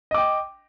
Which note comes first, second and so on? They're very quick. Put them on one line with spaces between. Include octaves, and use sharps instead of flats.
D#5 D6 G5